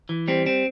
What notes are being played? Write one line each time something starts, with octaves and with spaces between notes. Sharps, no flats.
E3
G3 C4
C4